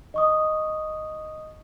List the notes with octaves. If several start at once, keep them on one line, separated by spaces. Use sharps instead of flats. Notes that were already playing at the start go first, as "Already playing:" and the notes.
D#5 C#6 D#6